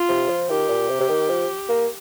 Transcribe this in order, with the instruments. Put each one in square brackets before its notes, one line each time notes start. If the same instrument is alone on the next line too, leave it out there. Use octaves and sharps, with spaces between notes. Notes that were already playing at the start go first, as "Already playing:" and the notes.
Already playing: [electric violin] F4
[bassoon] C3
F3
[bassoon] D#3 [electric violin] G4
[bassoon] A#2
C3
C3
D#3
F3
A#3